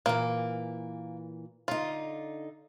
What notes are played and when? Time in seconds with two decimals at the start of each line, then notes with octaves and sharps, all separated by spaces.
0.06 A#2 E3 A#3
1.68 D3 D#4 F4